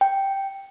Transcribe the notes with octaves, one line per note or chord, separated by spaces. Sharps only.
G5